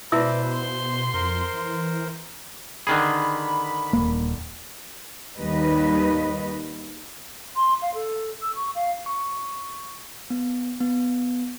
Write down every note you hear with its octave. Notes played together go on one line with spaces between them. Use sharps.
B2 E4 B4 C5 D5 E5 E6
C6
F2 A#4 C5
E3
D3 D#3 G#4 B5
D#1 A#3
D#2 D#3 G3 D#4 B4 D#5
C6
F5
A4
E6
C#6
F5
C#6
B3
B3